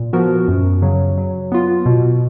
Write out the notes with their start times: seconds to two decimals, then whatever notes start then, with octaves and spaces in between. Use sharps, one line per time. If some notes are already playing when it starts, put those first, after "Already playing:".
Already playing: A#2
0.13 F3 B3 F#4 A#4
0.48 F#2
0.82 C#3 F#3
1.18 F#3
1.52 B3 F4
1.86 B2